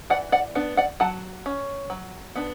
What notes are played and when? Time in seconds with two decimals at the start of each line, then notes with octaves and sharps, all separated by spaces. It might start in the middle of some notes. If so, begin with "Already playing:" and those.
0.10 E3 D5 F#5
0.32 D5 F#5
0.55 B3 D4
0.77 D5 F#5
1.00 F#3 F#5 A5
1.46 C#4
1.90 F#3
2.35 B3 D4